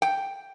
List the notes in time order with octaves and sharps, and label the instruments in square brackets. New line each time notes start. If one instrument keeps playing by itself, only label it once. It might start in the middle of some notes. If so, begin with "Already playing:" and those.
[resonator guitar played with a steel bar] G5